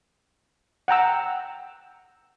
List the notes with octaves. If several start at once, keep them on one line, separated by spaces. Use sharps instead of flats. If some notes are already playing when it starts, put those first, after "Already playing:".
F#5 G5 A#5 E6